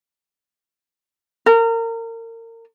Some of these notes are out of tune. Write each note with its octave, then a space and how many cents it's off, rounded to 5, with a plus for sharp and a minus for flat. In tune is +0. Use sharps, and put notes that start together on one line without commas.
A#4 -30